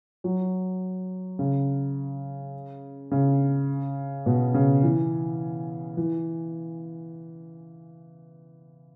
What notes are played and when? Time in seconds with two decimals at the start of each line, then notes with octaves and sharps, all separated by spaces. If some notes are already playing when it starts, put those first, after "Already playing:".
0.24 F#3
1.39 C#3
3.11 C#3
4.26 B2
4.54 C#3
4.83 E3
5.97 E3